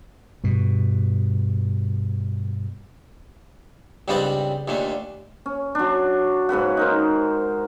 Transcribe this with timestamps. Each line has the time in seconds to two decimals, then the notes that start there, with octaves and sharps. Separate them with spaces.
0.44 G2 B2
4.08 C#2 G2 G3 B3 C4 D5
4.68 D#2 A#2 D3 A3
5.46 C#4
5.75 F#3 D4
6.49 G#2 C#3 B4 F#5
6.77 D#4 A#4 C5